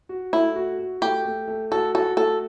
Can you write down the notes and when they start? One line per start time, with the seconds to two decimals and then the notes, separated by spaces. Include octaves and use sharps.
0.09 F#4
0.33 A3 E4
0.56 F#4
0.79 F#4
1.02 A3 G4
1.25 A3
1.48 A3
1.71 F#4 A4
1.95 F#4 A4
2.17 A3 A4